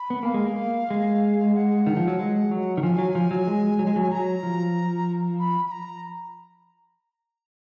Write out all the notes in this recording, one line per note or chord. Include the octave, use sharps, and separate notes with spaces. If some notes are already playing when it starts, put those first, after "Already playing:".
Already playing: B5
B3
A#3 F5
G#3
A#3
G#3
F#5
D#3
F3
F#3
G#3
F#3
D#3
F3 G#5
F#3
F3
F#3
G#3
F#3
G#3
F#3
G#5
F#3 A#5
F3
B5
B5
A#5